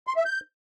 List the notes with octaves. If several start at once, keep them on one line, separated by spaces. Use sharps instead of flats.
C6
E5
G6